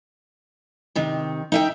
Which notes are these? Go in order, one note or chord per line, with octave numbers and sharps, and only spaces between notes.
C3 D#3
D#4 E5 G5